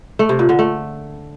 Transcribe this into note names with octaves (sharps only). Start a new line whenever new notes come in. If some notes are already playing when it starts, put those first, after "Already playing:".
A3
C3
A#2
D3
A3